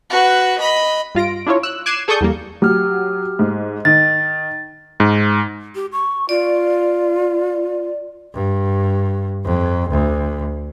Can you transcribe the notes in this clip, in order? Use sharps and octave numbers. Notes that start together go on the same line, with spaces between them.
F#4 B4
D#5 B5
G2 F4 A#6 D7
D4 E4 F4 C#5
E6 F#6
D6 F#6 G#6 C7 D#7 E7
G#4 A4 D5 C#6 D#6 G6
E2 G3 A#3
F#3 G4 F6
G#2
D#3 A6
G#2
G4
C#6
F4 D5
G2
F2
D2